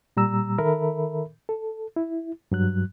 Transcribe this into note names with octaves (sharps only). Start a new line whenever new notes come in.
A#2 G3 A#5 E6
D#3 A4 A#4 E5 B5
A4
E4
G2 F#3 F#6